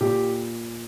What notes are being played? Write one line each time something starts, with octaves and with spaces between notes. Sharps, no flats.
A#2 G4